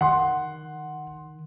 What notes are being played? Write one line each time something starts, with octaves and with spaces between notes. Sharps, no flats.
D#3 F#5 C6